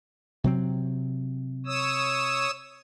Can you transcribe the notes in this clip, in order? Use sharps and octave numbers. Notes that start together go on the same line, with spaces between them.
C3 F#3 C4
C#5 D#6 E6